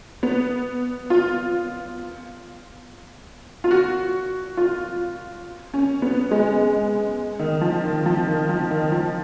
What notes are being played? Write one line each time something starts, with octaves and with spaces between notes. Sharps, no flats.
B3
F4
F4
F#4
F4
C#4
B3
G#3
D#3
F3
D#3
F3
D#3
F3
D#3
F3